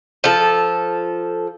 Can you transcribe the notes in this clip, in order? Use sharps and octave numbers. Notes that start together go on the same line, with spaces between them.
F3 A4